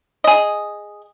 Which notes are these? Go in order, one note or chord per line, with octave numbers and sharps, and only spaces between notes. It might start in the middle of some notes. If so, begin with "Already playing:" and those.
G#4 D#5